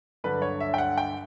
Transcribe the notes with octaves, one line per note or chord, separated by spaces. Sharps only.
G2 D3 F#3 B4
C#5
E5
G5
F#5
G5